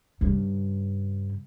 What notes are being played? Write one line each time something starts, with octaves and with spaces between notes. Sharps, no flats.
G2 C#3